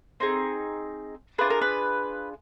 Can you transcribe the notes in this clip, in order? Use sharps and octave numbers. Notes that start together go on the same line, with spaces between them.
C4 D#4 G#4
D4 F4 G#4 B4
A#4
B4